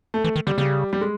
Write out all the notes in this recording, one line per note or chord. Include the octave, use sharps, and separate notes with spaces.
A3
E3 A3
D#3
D3 G3
C#3 G3
G3
G#3